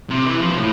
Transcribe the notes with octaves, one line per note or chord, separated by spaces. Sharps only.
C3
E3
F3
B2
A2